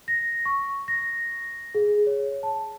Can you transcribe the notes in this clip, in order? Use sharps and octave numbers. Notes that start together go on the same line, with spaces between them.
A#6
C#6
A#6
G#4
C#5
A5